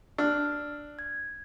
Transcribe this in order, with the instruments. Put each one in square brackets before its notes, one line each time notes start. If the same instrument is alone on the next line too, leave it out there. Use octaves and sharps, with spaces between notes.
[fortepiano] D4 [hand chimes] E6 F6
[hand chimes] G#6